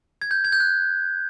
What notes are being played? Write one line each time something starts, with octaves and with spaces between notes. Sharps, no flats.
G#6
G6
G#6
G6
F#6